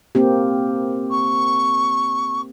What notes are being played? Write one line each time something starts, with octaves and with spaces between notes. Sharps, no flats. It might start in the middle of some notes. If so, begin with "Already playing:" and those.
A#3 C4 G4
C#6